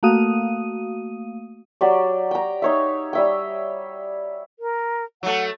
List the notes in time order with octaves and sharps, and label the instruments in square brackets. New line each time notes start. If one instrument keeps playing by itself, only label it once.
[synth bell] A3 A#3 F#4 F5 D#6 D#7
[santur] F#3 G4 D5
G5 A#5
D#4 C#5 E5
G3 E5 G5
[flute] A#4
[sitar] F#3 A3 [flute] F#5